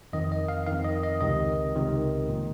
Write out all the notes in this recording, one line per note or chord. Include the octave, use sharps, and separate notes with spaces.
F2 D#3 D#5
D#5
F5
F2 D#3 F5
D#5
D#5
C#2 C3 D#3 D#5
C#2 C3 D#3
A#2